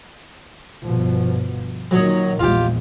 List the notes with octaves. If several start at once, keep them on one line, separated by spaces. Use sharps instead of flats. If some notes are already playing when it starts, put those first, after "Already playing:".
G1 B2 F3
A#2 D#3 F#3 C#5 D#5
A#1 E2 G#3 F4 G4